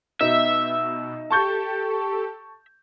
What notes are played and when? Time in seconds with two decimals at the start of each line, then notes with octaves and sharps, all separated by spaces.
0.21 B2 D#4 E5
1.30 G4 A4 A5 C#6 G6